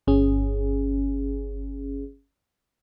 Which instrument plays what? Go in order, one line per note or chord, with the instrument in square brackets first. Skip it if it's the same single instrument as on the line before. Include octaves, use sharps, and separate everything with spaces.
[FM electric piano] G1 C#4 G#4